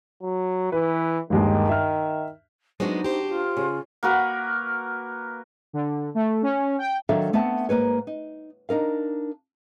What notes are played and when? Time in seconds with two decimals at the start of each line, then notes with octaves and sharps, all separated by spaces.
0.22 F#3
0.72 E3 B4
1.30 G1 D#2 D#3 G#3
1.69 E5 F6
2.80 F#3 G#3 B3 C4 D4 D#4 F#4
3.04 G4 C5
3.28 F4
3.57 C#3
4.03 A#3 F#4 A#4 B4
5.73 D3
6.15 A3
6.42 C#4
6.78 G5
7.09 D#3 F#3 D4 A4 E5 F5
7.33 A3 B3 C4 E5 F#5 A5
7.69 G#2 C#3 A#3 B4 C#5
8.07 D#4
8.69 D4 D#4 A#4 F5